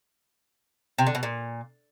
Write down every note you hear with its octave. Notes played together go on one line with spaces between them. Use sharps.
C3
D3
B2
A#2